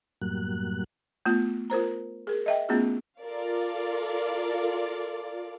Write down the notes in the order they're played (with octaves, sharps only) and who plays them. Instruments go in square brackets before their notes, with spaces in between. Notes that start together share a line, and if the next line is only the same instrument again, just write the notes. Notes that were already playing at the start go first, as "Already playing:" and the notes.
[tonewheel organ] F#2 A2 F#3 G3 A#3 F#6
[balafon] A3 B3 F4
F4 A#4 C5 A#5
G#4 A#4
D#5 E5 G5
A3 B3 C#4 F4 F#4 G#4
[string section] F4 A4 A#4 D5 F5